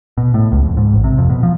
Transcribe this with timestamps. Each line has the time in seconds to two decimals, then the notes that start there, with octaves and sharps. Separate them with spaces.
0.18 B2
0.34 A2
0.52 C#2
0.65 F2
0.77 G#2
0.93 A1
1.04 C3
1.18 F2
1.30 B2
1.43 F3